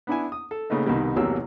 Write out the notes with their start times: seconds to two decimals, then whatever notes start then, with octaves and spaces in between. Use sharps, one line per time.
0.07 B3 D4 E4 G#5
0.32 D#6
0.51 A4
0.70 A#2 C#3 A3 B3 D#4
0.86 C2 B2 D#3 G3 B3
1.16 A1 E2 C3 F#3 A#3 E6